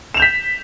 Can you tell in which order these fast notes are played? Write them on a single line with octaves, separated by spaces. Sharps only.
E7 F7 G6 B6